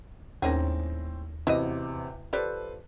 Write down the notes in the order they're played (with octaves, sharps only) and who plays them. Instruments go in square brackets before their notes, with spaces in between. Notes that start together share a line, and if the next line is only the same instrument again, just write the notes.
[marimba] D#2 [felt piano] A2 C4 A#6 [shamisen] A#3 C#4 G#4
[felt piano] A1 E2 C3 [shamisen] E4 F#4 D#5
[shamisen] F3 G4 D5 [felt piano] A4 B4 C5